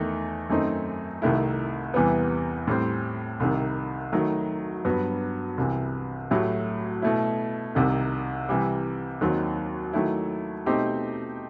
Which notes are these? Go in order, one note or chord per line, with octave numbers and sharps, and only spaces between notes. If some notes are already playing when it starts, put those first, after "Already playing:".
Already playing: E2 D#3 A3
F#2 D#3 A3 C4 D#4
C2 C3 D#3 A3 E4
E2 C3 E3 G3 B3
A2 G3 C4
C2 C3 D#3
D#3 F#3 A3
G2 F#3 B3 F#4
C2 C3 E3
A2 F#3 A3 E4 G4
B2 A3 E4
C2 C3 D#3
C3 E3 G3
D#2 D#3 F#3 C4
D#3 F#3 A3 E4
B2 A3 C4 D#4 G4